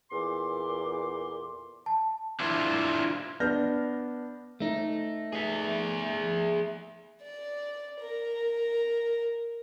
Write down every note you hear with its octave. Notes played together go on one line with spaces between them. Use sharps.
E2 A#2 A4 C6 D6
A5
D4 E4 F4 C5
B3 D4 F6 G6 A#6
A3 D#4
G#4 E5
D5
A#4